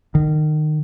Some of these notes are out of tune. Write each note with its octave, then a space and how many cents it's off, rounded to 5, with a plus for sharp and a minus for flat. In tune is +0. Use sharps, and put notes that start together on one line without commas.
D#3 -25